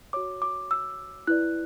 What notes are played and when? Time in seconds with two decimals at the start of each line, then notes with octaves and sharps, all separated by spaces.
0.13 F#4 C#5 D6
0.42 D6
0.71 E6
1.27 E4 B4 D5 F#6